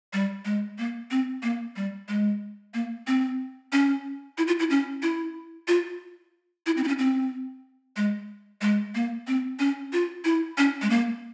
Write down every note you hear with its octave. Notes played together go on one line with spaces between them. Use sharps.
G3
G#3
A#3
C4
A#3
G3
G#3
A#3
C4
C#4
E4
F4
E4
C#4
E4
F4
E4
C4
E4
C#4
C4
G#3
G#3
A#3
C4
C#4
F4
E4
C#4
G#3
A#3